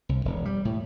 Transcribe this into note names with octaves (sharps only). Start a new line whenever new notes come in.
C2
E1
G3
A2